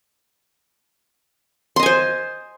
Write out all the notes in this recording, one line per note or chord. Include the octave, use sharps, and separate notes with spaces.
C5 D#5 G#5 C6